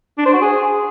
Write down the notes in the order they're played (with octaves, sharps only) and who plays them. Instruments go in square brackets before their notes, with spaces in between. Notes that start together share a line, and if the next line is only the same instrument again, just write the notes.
[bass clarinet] D4
C5
F#4
G#4